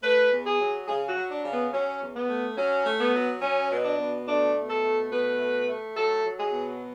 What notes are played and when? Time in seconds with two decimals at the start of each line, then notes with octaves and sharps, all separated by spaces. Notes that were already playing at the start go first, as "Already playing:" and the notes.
0.03 A3 B4
0.31 E2
0.46 G#4
0.60 F#3
0.88 C#3 G#4
1.09 F#4
1.16 F#3
1.30 D4
1.44 C#3
1.52 B3
1.72 F#3 C#4
2.00 E2
2.15 B3
2.29 A3
2.57 F#3 C#4
2.85 A3
2.99 B3
3.13 F#3
3.42 F#3 C#4
3.69 B2
3.83 D4
3.98 B2
4.27 A3 D4
4.54 B2
4.69 A4
4.83 A3
5.11 B2 B4
5.39 A3
5.68 A3
5.95 F#3 A4
6.24 F#3
6.38 G#4
6.52 B2